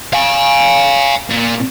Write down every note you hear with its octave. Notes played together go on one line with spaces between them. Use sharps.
F5 G#5
A#2